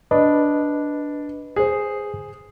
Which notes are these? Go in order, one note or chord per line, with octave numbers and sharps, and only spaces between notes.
D4 B4 D#5
G#4 C5